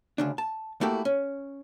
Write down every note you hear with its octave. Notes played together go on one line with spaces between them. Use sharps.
D2 C#3 D4
A5
A3 A#3 E4 F#4 G4 A4
C#4